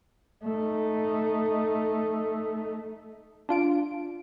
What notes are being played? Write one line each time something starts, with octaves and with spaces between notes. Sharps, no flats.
A3 D#4
D4 F4 D7